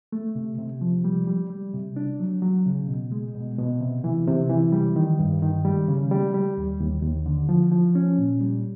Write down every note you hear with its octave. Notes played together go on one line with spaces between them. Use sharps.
A3
C3
C3
F3
G3
G3
G3
C3
D4
F#3
F#3
C#3
B2
G#3
B2
B2
C3
E3
C3
E3
G3
D#3
G2
D#3
G3
C#3
G3
G3
D#2
D#2
D#2
D3
F3
F3
C#4
A#2
G3